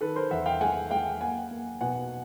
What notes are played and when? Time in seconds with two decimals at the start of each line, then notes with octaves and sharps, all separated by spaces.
0.01 D#3 A4 B4
0.16 A#4 C5
0.31 E2 E5 F#5
0.46 F5 G5
0.61 G#3 F#5 G#5
0.91 G#3 F5 G5
1.21 A#3 F#5 G#5
1.51 A#3
1.81 B2 F#5 G#5